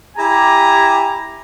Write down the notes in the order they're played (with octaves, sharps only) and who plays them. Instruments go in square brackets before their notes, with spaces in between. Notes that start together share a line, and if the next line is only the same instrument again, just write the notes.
[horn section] E4 G4 G#5 A#5